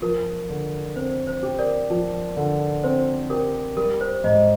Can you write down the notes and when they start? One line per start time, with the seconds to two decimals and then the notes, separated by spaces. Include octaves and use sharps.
0.02 F3 A#4
0.50 D3
0.96 C4 C5
1.27 C5
1.43 G4
1.59 A#4 D5
1.90 F3
2.37 D3
2.84 C4 C5
3.30 G4 A#4
3.76 G3 A#4
4.01 C5
4.24 G#2 C5 D#5